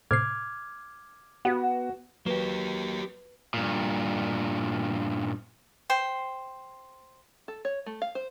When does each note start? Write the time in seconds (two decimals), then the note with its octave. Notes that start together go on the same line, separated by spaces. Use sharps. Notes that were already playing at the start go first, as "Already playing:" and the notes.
0.11 A2 C3 D6 F6 G#6 C7
1.45 B3 F#4
2.26 F#3 A#3 G4 B4
3.54 G2 A#2
5.90 C5 G5
7.48 A4
7.65 C#5
7.86 A3
8.02 F5
8.15 C5